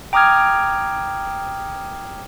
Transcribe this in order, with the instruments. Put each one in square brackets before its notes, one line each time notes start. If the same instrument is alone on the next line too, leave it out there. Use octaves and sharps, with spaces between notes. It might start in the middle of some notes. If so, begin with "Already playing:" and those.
[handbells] G5 A#5 D6 D#6 F6 G#6